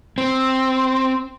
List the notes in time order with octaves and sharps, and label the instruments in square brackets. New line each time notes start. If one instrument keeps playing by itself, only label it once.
[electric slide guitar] C4